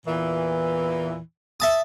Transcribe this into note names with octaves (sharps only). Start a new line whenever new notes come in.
E2 A#2 E3
E5 A5 D#6